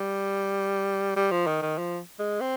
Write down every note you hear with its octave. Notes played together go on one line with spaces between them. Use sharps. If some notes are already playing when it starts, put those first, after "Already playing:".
Already playing: G3
G3
F3
D#3
D#3
F3
G#3
C4